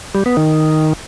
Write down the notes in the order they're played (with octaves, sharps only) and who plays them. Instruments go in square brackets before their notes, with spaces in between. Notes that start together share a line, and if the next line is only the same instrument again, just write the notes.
[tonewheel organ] G3
B3
D#3